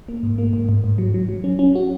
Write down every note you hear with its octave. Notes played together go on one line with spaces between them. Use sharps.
A#3
G#2
A#3
G#2
G#2
G#2
F#3
F#3
F#3
C#4
C#4
F#4